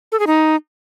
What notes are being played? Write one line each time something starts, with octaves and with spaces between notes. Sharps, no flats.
A4
G#4
D#4